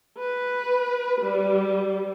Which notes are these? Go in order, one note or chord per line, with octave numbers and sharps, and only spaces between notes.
B4
G3